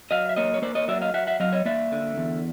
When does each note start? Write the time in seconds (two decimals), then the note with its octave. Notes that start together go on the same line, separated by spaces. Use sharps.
0.11 F#3 D#5 F5
0.29 E5
0.36 A#3 C#5 D#5
0.54 C#5
0.62 A#3 C5 D5
0.75 C#5 D#5
0.88 F#3 D5 E5
1.02 D#5 F5
1.14 F#3 E5 F#5
1.27 E5 F#5
1.40 F#3 D#5 F5
1.52 C#5 D#5
1.65 A#3 D5 E5
1.92 D3
2.18 E2